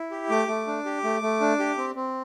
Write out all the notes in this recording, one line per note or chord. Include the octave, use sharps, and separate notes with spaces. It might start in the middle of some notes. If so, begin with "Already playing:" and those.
Already playing: E4
G4
A3 D6
A3
D4
G4
A3
A3
D4
G4
C4
C4